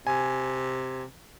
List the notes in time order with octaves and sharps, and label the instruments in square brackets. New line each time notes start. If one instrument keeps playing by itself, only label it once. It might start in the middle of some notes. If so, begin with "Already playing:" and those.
[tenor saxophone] C3 [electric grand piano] G#5